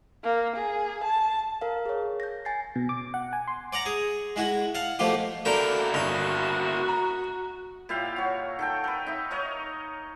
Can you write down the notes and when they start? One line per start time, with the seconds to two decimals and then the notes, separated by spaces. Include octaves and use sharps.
0.24 A#3
0.56 G#4
1.04 A5
1.61 A#4 F5
1.86 G#4 C#5
2.20 G6 A#6
2.45 G#5 A6 C7
2.76 B2
2.89 D6
3.14 F#5
3.33 G#5
3.47 C6
3.73 D5 F#5 A#5
3.86 G#4
4.36 G#3 E4 F#4
4.75 F5 F#5 A5
4.99 B2 F3 A3 A#3 F4 G4
5.45 D3 A#3 E4 F#4 A#4 G5
5.94 G1 D#4
6.88 A#5
7.89 A#2 E4 G4 F5
8.16 F#4 C#5
8.59 D#3 A4 G5
8.84 A#4 B4
9.07 D#4 E5
9.31 A#4 C#5 D#5